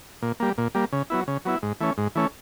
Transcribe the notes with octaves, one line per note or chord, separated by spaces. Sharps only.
A#2
G3 A#3
A#2
G3 A#3
C#3
F#3 B3 E4
C#3
F#3 B3 E4
G#2
E3 A3 C#4
G#2
E3 A3 C#4